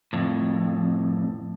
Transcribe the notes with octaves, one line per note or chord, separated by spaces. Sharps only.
F2 A2